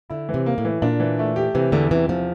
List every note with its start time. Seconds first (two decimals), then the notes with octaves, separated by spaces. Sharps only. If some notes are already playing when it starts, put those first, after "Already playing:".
0.10 D3 E4
0.29 E3
0.34 C3
0.46 A#3
0.58 A2
0.65 E3
0.82 A#2 D4
1.00 E3
1.19 A3
1.36 G4
1.55 C3 E3
1.72 E2 D3
1.91 C3 E3
2.09 E2 F3